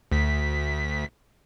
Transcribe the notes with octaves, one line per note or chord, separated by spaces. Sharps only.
D2 B6